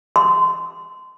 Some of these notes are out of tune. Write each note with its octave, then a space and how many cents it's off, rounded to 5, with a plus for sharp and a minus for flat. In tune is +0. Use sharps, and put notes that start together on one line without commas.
C6 -25